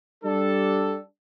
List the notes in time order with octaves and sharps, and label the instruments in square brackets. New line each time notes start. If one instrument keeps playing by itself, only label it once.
[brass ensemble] G3 D4 A4